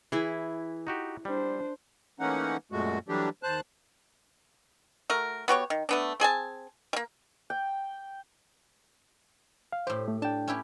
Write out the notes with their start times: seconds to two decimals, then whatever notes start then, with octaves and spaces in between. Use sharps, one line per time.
0.12 E3 E4 G#4
0.87 D#4 F#4 G4
1.25 G3 D4 C5
2.20 E3 A3 A#3 C#4 D#4 F#5
2.72 F#2 A#2 G#3 A3 F#4
3.09 E3 F#3 G3 A3 D4 G4
3.43 D#2 C5 A5 F#6
5.10 A3 F#4 A#4
5.48 B3 F#4 G4 C#5
5.70 D#3
5.89 A3 B3 D4
6.20 C4 G#4 G#5 A5
6.93 G3 A#3
7.50 G5
9.72 F5
9.87 A2 G4 C5
10.08 A3
10.22 D4 G5 A5
10.48 C#4 E4 G4